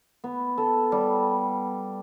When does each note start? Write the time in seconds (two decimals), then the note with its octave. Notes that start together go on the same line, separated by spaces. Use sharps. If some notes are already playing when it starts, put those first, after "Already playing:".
0.24 B3
0.58 A4
0.92 G3